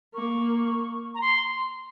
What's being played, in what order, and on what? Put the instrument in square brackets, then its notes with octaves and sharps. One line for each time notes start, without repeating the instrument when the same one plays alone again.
[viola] A#3 [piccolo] C#6
[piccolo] A#5
C6